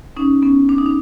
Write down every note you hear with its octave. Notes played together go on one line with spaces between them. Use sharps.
C#4 D#4
B3 C#4
D4
D#4
D4